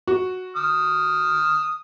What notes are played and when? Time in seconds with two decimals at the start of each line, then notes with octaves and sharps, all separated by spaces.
0.07 F#4
0.56 D#6 F6